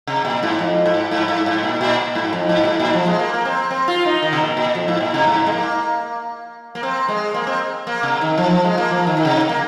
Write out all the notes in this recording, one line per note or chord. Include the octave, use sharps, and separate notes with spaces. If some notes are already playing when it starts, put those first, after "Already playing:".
C3
A#2
G#2
F2
G#2
G#2
G#2
G#2
A#2
A#2
G#2
F2
G#2
A#2
G#2
A#2
F3
G#3
A#3
A#3
C4
C4
F4
D#4
D#3
C3
A#2
A#2
F2
G#2
A#2
C3
G#2
G#3
A#3
A#3
C4
G#3
A#3
C4
A#3
C3
D#3
F3
F3
G#3
A#3
F3
D#3
D#3
C3
A#3